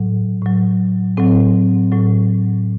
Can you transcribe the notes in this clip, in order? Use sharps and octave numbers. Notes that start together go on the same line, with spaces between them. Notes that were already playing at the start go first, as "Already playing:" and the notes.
Already playing: A2 F#3
A2 F#3
A2 F#3 C4
A2 F#3